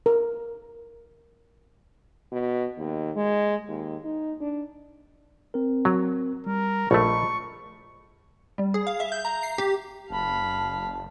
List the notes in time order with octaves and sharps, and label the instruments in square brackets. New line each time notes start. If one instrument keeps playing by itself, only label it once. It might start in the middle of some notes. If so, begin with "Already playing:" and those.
[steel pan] A#4
[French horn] B2
D#2
G#3
D#2
D#4
D4
[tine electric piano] C4 A#4
[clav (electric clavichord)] F#3
[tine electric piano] G3 [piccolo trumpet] A#4
[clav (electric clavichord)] A#1 A3 [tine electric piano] D#5 A5 B5 [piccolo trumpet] C#6
[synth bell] G3
G#4
F5
E5
G6
A#5
C7
G4
[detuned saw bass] F#1 [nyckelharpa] F5 B5 [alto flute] A5